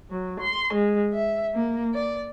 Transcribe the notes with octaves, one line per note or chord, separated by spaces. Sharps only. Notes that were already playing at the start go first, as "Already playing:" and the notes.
F#3
C6
G#3
E5
A#3
D5